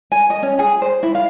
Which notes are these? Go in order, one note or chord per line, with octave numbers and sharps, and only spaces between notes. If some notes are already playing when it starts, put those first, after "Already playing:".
G#5
D#5
C#4
G#4
C5
E4
F5